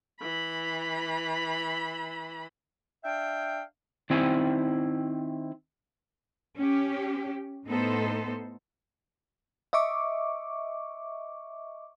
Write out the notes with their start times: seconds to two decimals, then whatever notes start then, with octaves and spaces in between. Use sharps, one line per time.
0.20 E3 B5
3.04 D4 E5 F5 G5
4.10 D#3 C4 E4 G#5
6.57 C#4 G4
7.67 A2 B3 D#4 A4 C5
9.73 D#5 E5 C#6 D6